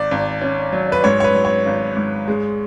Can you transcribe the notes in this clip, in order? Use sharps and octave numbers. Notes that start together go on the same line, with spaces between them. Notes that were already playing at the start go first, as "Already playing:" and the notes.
Already playing: G#1 D5
G#1
C#4
F#3
B4
G#2 C#5
C#5
B4
F#3
C#5
G#1
G#2
G#3